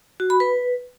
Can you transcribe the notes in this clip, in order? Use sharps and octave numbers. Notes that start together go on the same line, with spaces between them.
F#4
B5
B4